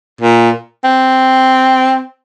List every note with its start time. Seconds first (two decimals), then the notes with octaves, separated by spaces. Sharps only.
0.21 A#2
0.84 C4